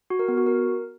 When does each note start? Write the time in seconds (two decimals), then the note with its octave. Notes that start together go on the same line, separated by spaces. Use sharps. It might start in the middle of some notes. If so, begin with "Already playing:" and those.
0.10 F#4
0.19 A#4
0.28 B3
0.37 F#4
0.46 A#4